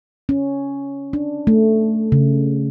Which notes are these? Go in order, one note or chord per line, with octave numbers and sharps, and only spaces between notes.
C#4
D4
A3
C#3